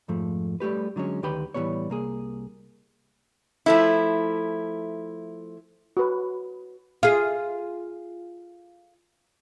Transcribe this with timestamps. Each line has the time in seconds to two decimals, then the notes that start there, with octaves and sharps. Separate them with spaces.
0.08 F2 G#2 F3 A3
0.60 G3 A3 G4 B4
0.96 D3 F#3 G#3 C#4
1.23 D2 D#3 G4 B4 G5 B5
1.54 A2 E3 F3 G3 B3 C#5
1.90 C2 A#3 G#4
3.66 F3 A3 E4
5.97 F#4 B4
7.03 F4 G#4